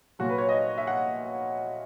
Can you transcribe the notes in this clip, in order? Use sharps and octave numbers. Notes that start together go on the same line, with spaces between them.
A#2 F#3 F#4
B4
C#5
D#5
E5
F#5